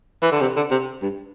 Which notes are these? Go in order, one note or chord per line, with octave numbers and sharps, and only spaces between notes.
E3
D3
C3
D3
C3
G2